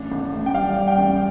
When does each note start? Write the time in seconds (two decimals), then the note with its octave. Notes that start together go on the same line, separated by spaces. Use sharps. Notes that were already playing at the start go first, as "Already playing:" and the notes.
Already playing: A1 D4
0.12 A1
0.33 A1
0.46 G5
0.54 G3 F5
0.77 G3
0.87 G5
0.98 A1